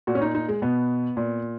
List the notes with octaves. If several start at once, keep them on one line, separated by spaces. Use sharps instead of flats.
A#2 F#4
C#4
D#4
D#4
G#3
B2 B3
A#2